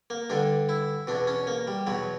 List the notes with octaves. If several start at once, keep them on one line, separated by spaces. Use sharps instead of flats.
A#3
G2 D3 D4
E4
E2 B2 D4
C#4
A#3
G3
E2 B2 F#3